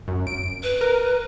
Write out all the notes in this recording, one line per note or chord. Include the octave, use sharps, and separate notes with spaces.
F#2
D7
B4
A#4